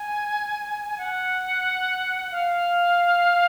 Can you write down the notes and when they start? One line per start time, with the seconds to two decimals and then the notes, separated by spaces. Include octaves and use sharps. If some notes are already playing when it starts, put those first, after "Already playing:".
Already playing: G#5
0.98 F#5
2.32 F5